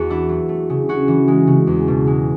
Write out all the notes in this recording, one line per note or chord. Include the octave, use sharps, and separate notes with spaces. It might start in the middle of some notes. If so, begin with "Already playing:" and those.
Already playing: E2 F#4 G#4
D4 E4
F#3
A3
C#3
C#4 F#4
E3
G#3
C#3
E2
B2
G#3